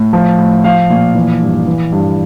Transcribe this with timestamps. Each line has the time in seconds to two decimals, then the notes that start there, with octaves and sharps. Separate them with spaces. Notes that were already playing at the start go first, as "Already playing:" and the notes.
Already playing: A2
0.13 F3
0.38 A2
0.64 F3 F5
0.90 A#2
1.15 E3
1.41 G2
1.67 E3
1.92 G2